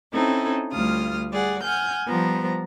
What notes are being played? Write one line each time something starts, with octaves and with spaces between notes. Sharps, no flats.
C4 C#4 D#4 E4 A4
D2 G3 A3 F4 D#6 F6
G3 G#4 D5 F#5
F#5 G#5 F6 G6
F3 G3 B3 C5 A#5